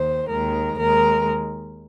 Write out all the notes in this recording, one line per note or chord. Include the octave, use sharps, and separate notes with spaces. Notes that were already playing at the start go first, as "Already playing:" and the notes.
Already playing: D#2 D#3 C5
D#2 D#3 G#3 A#4
D#2 D#3 G#3 A#4